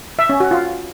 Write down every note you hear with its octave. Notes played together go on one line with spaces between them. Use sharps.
E5
C#4
F#4
F4